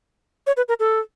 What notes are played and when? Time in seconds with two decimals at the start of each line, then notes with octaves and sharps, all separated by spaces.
0.47 C#5
0.57 B4
0.68 A#4
0.80 A4